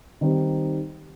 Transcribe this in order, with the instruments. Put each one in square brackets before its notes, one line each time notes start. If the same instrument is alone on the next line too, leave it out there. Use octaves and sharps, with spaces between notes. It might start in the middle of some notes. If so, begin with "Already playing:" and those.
[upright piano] D#3 G3 C4 D#4